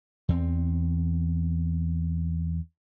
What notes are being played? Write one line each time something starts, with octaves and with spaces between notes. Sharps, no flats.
E2 C4